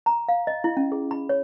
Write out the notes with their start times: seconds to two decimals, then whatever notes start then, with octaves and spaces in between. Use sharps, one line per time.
0.06 A#5
0.28 F5
0.47 D#5
0.64 E4
0.77 C#4
0.92 G#4
1.11 B5
1.29 C#5